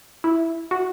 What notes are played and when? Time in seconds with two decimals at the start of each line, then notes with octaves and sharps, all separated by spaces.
0.24 E4
0.71 F#4